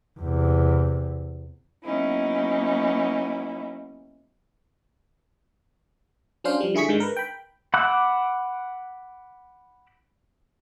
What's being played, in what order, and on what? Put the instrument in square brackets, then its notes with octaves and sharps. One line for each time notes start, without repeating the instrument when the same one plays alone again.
[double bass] E2 C3
[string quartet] F#3 A#3 B3 C#4 D#4 E4
[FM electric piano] F#3 C#4 D4 C5 F5
F3 G3
D3 E4 G#4 C#6 B6
G#2 D3 D#3 G#3
A#4 B4
G5 B5
[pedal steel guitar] F#5 B5 D6 E6 F#6